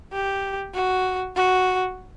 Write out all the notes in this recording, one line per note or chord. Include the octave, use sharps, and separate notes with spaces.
G4
F#4
F#4